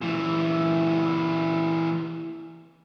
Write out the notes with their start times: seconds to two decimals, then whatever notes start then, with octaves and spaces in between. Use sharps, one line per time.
0.01 A#2 E3